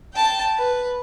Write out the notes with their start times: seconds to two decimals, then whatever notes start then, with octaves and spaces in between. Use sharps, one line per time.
0.14 G5 A5
0.58 B4